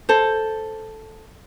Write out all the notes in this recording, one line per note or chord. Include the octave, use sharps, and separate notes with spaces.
A4 C5